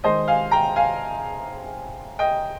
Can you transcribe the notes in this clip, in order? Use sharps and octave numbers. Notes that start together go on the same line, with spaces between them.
D#3 G#3 C5 D#5
F5 G#5
G5 A#5
F5 G#5
D#5 G5